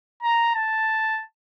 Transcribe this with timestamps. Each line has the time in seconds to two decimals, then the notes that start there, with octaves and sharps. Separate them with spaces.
0.23 A#5
0.55 A5